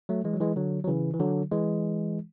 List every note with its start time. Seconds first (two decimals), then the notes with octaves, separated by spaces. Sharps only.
0.09 F#3 A3
0.24 E3 G#3
0.34 F#3
0.40 E3 G#3
0.56 D3 F#3
0.84 F#3
0.88 C#3 E3
1.14 E3
1.20 D3 F#3
1.52 E3 G#3